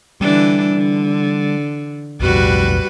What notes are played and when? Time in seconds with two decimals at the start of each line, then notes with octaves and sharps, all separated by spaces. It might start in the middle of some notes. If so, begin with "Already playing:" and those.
0.21 D3 E3 G3 D4
0.74 D3
2.21 B1 F2 A2 G3 F#4 B4